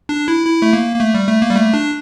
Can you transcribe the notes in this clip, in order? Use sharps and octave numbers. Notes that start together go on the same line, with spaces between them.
D4
E4
E4
A3
A#3
A#3
A3
G3
A3
A#3
G3
A3
D4